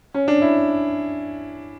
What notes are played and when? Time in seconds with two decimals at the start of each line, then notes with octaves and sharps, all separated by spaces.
0.14 C#4
0.28 D4
0.42 E4